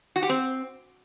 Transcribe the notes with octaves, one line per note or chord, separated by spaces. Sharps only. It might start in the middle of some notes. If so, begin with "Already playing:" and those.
F#4
G4
C4